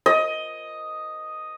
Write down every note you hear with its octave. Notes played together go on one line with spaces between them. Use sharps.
D#5